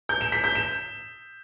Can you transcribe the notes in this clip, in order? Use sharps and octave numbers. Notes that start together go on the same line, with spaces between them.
G6
E7
B6
G6
E7